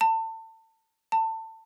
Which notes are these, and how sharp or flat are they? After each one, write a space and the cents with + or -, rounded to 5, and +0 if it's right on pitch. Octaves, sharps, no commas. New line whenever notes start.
A5 +30
A5 +25